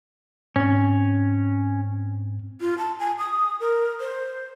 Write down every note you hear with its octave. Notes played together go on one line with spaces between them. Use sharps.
G#2 C4 C#4
F4
A5
G#5
D#6
A#4
C5